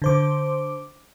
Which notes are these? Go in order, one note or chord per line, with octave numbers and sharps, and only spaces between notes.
D3 C5 D6